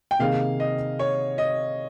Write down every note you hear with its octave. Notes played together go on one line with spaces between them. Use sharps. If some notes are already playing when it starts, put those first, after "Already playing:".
G5
C3 D#3 A#3 D#4 G#4 F5
D#5
C#5
D#5